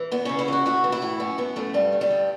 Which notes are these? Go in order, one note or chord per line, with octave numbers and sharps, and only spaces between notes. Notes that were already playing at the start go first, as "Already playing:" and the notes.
Already playing: E3
E2 B3
C#3 C#4
E4
E3 F#4
A2 F#4
E3
E4
A2
F#2 C#4
E3 B3
F#2 A3
G2 G3
D3
G3
G2